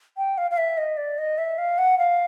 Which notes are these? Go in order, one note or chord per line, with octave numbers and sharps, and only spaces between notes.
G5
F5
F5
E5
D#5
D5
D#5
E5
F5
F#5
F5